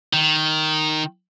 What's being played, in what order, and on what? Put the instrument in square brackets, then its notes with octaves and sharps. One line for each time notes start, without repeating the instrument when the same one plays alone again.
[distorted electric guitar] D#3